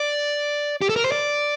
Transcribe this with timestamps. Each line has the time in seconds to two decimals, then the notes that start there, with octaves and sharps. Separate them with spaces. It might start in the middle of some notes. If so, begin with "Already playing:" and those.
Already playing: D5
0.82 G4
0.89 A4
0.96 A#4
1.04 C5
1.12 D5